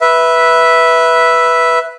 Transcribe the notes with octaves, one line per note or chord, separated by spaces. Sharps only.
B4 E5